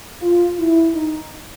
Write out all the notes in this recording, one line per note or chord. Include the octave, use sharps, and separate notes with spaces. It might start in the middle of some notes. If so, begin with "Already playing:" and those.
F4
E4
D#4